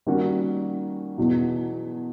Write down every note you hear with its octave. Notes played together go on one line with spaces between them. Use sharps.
D#3 G3 A#3 C#4 F#4
E2 B2 F#3